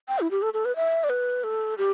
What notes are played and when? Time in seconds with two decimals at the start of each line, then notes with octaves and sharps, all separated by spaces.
0.08 G5
0.20 E4
0.31 G4
0.42 A4
0.54 A4
0.65 B4
0.76 E5
1.04 D5
1.10 B4
1.44 A4
1.78 G4